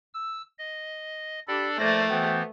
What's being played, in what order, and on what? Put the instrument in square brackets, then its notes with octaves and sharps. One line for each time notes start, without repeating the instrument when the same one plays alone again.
[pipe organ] E6
D#5
[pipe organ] D4 A4 D5 [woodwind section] G4 B5
[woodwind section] A2 F3 A#3 [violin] A3 [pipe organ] C5 D5 A#6
[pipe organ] E3 B3 [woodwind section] F#4 C5 G5